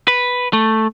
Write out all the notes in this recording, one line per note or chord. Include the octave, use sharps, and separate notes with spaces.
B4
A3